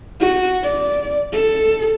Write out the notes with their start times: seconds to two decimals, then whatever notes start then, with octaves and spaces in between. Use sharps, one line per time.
0.20 F#4
0.63 D5
1.32 A4